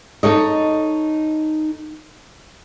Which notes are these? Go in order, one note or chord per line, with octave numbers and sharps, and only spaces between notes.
D#4 A4 C#5 D#5